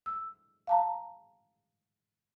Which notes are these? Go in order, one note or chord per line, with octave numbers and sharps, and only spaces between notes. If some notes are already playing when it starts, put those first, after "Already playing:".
E6
F5 A5 A#5